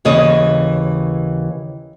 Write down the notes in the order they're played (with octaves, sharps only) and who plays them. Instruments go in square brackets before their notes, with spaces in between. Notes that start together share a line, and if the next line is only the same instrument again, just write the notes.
[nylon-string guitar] D#2 C#3 E3 C#5 D#5